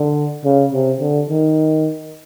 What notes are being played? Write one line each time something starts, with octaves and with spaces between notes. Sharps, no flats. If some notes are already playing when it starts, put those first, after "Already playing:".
Already playing: D3
C#3
C3
D3
D#3